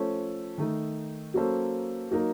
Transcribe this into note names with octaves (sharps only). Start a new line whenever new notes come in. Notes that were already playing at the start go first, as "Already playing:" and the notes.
Already playing: F3 A3 C#4 A4 C5
D#3 A3 D#4
F#3 A#3 C#4 A4 C5
F#3 A#3 D#4 A#4